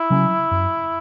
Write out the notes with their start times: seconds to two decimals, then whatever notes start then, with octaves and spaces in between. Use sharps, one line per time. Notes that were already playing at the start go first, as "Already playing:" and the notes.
Already playing: E4
0.10 C#3 F#3 C#4
0.51 F#2